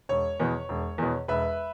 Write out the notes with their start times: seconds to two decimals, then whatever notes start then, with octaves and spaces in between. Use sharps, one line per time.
0.09 E1 C#5
0.40 E2 B2
0.69 E1
0.98 E2 B2
1.28 E1 B4 E5